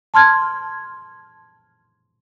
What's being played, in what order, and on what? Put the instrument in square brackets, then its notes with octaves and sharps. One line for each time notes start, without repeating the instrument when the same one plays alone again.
[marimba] A5 C6 F6 G#6